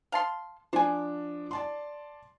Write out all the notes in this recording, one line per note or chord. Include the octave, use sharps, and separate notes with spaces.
F5 A5 C6
F3 D4 C5 G#5
D5 A5 C6